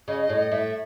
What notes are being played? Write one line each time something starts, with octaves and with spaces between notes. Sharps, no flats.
C#3 D#5
D#5
A2
D#5
A2 E5